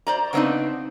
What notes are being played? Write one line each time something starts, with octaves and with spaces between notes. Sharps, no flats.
C5 D5 A#5
C#3 B3 C4 D4 D#4